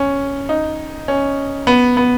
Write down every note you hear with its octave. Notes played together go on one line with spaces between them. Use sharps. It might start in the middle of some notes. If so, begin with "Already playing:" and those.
Already playing: C#4
D#4
C#4
B3
B3